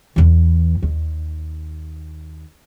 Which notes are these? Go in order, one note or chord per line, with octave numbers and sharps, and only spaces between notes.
E2 E3
D#2